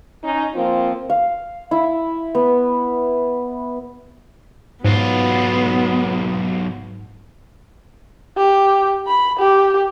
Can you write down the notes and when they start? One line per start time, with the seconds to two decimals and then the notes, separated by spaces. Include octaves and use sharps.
0.23 C#4 D#4
0.54 F3 A#3 C4 F4
1.10 F5
1.71 E4
2.35 B3
4.85 B1 G#2 F#3 B3 F4
8.37 G4
9.07 B5
9.39 G4